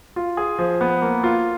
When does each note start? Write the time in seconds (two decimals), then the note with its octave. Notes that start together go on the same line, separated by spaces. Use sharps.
0.16 F4
0.37 G#4
0.58 F3
0.81 B3
1.02 A#3
1.24 F4